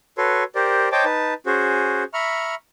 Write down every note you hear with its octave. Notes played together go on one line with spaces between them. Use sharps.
F#4 A4 B4 C#5 C6
G4 A#4 C5 D5
C5 C#5 D#5 G5 A5 D6
D#4 B4 A5
C#4 F#4 G#4 C5
E5 A#5 B5 C#6 F6